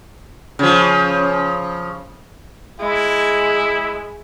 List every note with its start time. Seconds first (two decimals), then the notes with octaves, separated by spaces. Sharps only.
0.59 C#3 F3
2.79 G#3 E4